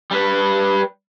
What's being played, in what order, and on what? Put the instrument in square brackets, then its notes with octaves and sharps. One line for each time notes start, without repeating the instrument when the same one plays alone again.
[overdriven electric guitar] G3 B4